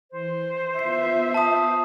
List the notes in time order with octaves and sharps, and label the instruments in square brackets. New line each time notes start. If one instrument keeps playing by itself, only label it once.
[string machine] E3 [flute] C5
[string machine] B3 F4 B4 [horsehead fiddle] E5 [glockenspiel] C7
[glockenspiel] A5 D#6